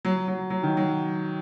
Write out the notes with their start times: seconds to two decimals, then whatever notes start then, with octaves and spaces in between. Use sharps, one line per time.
0.05 F#3
0.28 F#3
0.50 F#3
0.63 D#3
0.77 F#3